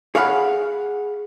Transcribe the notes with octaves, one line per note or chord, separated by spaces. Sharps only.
G#4 C#5 F5 F#5 G#5 B5